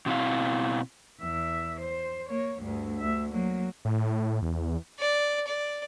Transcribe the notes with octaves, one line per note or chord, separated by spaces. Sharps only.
B2 C4 E4 F5
E2 E5
C5
A#3 C#5
D2 G2
D2 E5
F#3 A#3
A2
E2
D5
D5